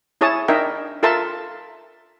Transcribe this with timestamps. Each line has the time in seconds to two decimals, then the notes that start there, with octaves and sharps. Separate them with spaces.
0.21 E4 G#4 C#5 A5 D#6
0.48 D4 D#4 A#4 D#5 E5 G5
1.03 F4 A4 A#4 E5 A5 C6